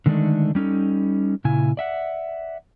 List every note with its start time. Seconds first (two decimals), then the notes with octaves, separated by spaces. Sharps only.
0.06 D3 D#3 G#3 A3 D4 D#4
0.55 G3 C#4 D#4 A4
1.44 A#2 C#3 E4 G#5
1.77 D5 E5 F#5